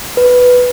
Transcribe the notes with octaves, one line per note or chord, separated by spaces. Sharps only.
B4